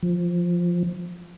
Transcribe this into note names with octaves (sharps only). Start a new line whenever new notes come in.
F3